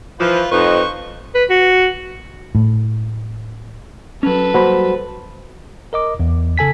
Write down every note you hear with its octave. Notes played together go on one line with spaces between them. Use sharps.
E3 F3 F4 B4
F2 D#4 B4 C5 C#6
B4
F#4
A2
F#3 C#4 A4 B4
F#3 G3 A#3 F#4 C5 B5
A#4 D#5 D6
E2
C#3 A4 G#5 B6